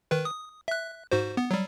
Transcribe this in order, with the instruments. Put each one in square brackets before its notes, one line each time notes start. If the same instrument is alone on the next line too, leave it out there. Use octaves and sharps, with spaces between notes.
[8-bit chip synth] D#3 B4
D#6
E5 F#6
G#2 F#4 C5
B3
F#3 G3